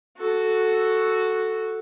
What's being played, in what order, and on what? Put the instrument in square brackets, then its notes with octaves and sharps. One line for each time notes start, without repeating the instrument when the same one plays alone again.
[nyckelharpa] F#4 A4